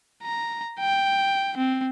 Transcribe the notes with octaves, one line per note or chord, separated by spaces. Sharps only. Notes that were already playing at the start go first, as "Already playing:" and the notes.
A#5
G5
C4